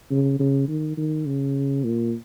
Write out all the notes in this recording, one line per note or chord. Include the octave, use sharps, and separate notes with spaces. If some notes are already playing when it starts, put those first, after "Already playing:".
C#3
C#3
D#3
D#3
C#3
A#2